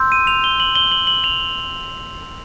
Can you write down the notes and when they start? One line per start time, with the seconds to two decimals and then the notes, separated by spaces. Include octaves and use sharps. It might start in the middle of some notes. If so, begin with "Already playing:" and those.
Already playing: C6 E6 G6
0.12 D#7
0.27 F7
0.44 G7
0.60 F#7
0.75 G7
0.92 F#7
1.07 F#7
1.24 F7